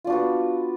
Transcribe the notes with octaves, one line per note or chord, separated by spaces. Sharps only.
B3 D4 F4 F#4